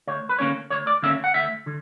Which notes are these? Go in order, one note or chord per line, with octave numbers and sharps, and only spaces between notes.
D2 C#5
B4
D3 A#3 C#4 C#5
D2 C#5
D5
D3 A#3 C#4 E5
F#5
D2 E5
D3